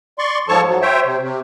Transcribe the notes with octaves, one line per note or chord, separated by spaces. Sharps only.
D5 C6 C#6
G#2 F3 A4 C#5 A5 C#6
F#3
C5 C#5 E5 G5
C3
C3